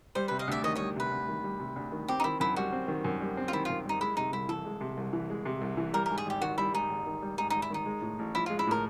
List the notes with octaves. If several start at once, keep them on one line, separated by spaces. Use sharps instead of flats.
G3 C5
C3 B4
D#5 F5
D2 D5 E5
D#3 C#5 D#5
G3 C#5 D#5
C3 B4
D2
D#3
G3
C3
D2
D#3
C4 G4
D#4
D#3 E4
F#2 E4
G3 F#4
C4
D#3
F#2
G3
C4
F4
D#3 E4
F#2 F4
G3 D#4
G#3 E4
C3 D#4
C2 E4
E3 A4
G#3
C3
C2
E3
G#3
C3
C2
E3
G3 A#4
G#2 A#4
G#4
G#1 G4
D#3 F#4
G3 E4
G#2 D#4
G#1
D#3
G3
G#2 D#4
G#1 D#4
E4
D#3 D#4
G#3
A2
A1
F3 E4
G#3 F4
E4
A2 A#4